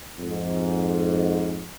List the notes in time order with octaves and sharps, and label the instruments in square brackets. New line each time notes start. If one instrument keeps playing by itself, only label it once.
[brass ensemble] F2 G#2